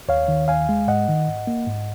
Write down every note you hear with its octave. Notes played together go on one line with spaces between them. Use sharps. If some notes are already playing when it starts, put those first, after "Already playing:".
D#2 C#5 F5
D#3
D#2 F5 G#5
G#3
G#2 D#5 F#5
D#3
G#2
A#3
G#2